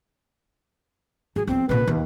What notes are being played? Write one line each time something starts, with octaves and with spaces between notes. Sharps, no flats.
F#3 G#4
F3 B3 C4
A#2 C#3 B4
D#2